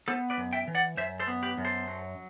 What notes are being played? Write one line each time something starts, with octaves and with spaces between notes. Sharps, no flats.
B3 A4 C5
B4 D5
F#2
E5 G5
E3
D5 F#5
F#2 C5 E5
A4 C5
B3
G4 B4
F#2
A4 C5
F#3